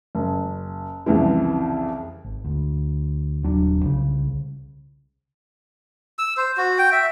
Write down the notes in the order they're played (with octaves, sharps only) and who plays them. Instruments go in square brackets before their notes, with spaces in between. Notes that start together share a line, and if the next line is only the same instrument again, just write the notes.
[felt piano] F#1
C2 F2 C#3 E3
[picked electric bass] G#1
D2
D#1 F#3 D4
C2 C#3
[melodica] E6
C5
F#4
G5
E5